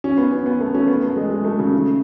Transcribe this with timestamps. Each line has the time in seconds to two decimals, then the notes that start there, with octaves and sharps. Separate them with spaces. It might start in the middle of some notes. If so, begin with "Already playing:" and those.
0.04 C#4
0.18 B3
0.32 C#4
0.46 B3
0.61 A3
0.74 C#4
0.88 B3
1.03 A3
1.16 G#3
1.30 G#3
1.45 A3
1.59 C#3
1.73 C#3